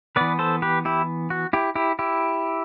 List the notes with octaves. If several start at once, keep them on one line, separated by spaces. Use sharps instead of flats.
E3 B3 B4 D5
A4 C5
G4 B4
E4 G4
F#4
E4 G4
E4 G4
E4 G4